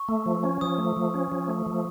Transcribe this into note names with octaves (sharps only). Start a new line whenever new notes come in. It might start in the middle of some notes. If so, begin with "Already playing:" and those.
Already playing: C#6
A3
F3
C#4
F3 D#6
A3
F3
C#4
F3
A3
F3